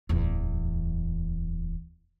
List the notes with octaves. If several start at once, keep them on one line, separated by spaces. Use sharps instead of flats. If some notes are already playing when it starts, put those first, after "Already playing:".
D1 E2